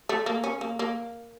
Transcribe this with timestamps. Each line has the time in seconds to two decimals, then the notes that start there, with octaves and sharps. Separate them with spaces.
0.09 A3
0.26 A#3
0.44 C#4
0.61 A#3
0.79 A#3